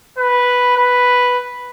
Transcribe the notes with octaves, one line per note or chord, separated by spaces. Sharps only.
B4
B4